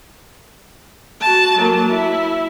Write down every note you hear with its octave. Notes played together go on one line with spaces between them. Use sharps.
F#4 A5
F#3 A#3
E4